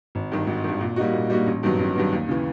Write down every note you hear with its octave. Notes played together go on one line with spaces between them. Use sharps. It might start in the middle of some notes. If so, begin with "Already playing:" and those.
G#1
G2 D#3
G#1
G2 D#3
A#2
G3 A#3 D#4 F#4
A#2
G3 A#3 D#4 F#4
A1
G2 D#3 F#3 B3
A1
G2 D#3 F#3 B3
D#2
C#3 E3